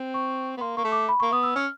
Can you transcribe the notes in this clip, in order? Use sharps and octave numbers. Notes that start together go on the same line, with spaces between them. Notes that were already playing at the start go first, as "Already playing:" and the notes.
Already playing: C4
C#6
B3
A#3 C6
A#3 C#6
A3
D6
B5
A#3 C#6
B3 D#6
E6
C#4 F6